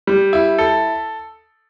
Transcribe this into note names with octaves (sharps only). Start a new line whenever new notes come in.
G3
E4
A4